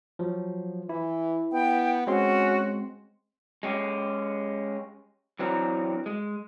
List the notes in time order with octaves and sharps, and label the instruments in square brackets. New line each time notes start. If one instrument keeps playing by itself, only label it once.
[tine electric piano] F3 F#3
[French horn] E3 [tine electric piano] E4
[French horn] B3 [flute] G5
[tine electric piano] G#3 C4 C6 [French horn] C#4 [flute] F#4
[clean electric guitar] G#3 C#4 G4
E3 F#3 C4 D4 A#4
G#3